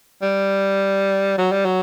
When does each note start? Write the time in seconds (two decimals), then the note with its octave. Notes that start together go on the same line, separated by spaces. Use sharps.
0.22 G3
1.38 F#3
1.52 G3
1.65 F#3